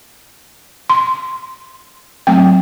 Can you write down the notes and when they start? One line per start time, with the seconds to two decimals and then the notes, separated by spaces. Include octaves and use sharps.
0.90 C6
2.27 F#3 A3 C4 G5